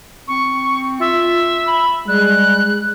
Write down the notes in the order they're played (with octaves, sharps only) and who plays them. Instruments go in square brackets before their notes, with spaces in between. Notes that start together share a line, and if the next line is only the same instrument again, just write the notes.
[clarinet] C4 [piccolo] C#6
[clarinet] F4 [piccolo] E5
[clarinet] B5
[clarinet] G3 [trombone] G#3 [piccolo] F#6